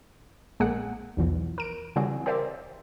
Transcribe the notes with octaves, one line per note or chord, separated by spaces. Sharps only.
A#1 G#3 A#3 G#4 F#5
B1 E2 B2 E3 F3
A#4 D7
C#3 E3 G3 C4 F#4 G#4
G4 A#4 C5 D5 E5